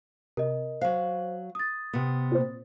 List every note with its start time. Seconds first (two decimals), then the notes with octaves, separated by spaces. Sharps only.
0.37 C3 A#4 D#5
0.81 F#3 C5 F5
1.55 D#6 A6
1.93 C3 B3
2.31 A#2 C4